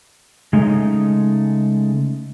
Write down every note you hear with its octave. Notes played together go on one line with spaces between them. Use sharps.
C#3 G#3 A3 D#4